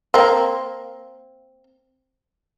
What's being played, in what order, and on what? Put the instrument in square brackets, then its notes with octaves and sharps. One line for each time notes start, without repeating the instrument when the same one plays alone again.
[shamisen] A#3 C4